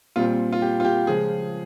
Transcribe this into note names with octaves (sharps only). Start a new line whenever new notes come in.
A#2 G3 C4 F4
F4
G4
F4
G4
C#3 F3 G#3 G#4